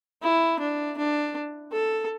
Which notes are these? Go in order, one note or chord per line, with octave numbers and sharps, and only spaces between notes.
E4
D4
D4
A4